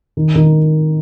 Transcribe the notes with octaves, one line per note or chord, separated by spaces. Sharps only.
D#3
D#3